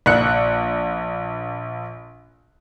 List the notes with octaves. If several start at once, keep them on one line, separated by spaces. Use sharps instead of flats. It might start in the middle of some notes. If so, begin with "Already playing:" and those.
A#1 F#6 C#7